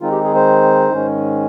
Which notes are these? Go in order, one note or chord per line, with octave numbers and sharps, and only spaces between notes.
D#3 G#3 C4 D#4 F4
G4
G#4
C5
G#2 D#3 G#3 C#4